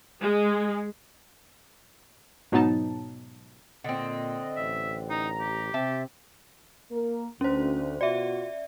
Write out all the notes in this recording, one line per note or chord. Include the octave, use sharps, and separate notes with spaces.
G#3
G#2 B2 F#3 B3 D#4 A5
A#2 D3 C4 D#5
A1 E5
D#4 A#5
G4
C3 C4 E5 A5
A#3 A#4
D2 C#4 C5
B2 F4 F#4 D5 E5